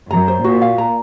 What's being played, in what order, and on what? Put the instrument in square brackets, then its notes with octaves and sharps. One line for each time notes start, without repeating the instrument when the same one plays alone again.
[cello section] F#2 [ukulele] A#5
[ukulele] C5
[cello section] A#2 [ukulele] F#4
[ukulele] F5
A#5